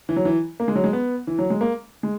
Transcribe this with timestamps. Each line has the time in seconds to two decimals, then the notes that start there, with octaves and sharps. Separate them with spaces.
0.09 E3
0.16 F#3
0.25 E3
0.60 A#3
0.68 G#3
0.75 F#3
0.84 G#3
0.93 B3
1.27 E3
1.39 F#3
1.50 G#3
1.61 A#3
2.03 G#3